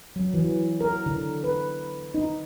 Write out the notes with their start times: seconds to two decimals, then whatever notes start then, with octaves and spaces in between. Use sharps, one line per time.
0.16 F#3
0.34 E3
0.81 A#4
1.06 D3
1.44 B4
2.14 D#4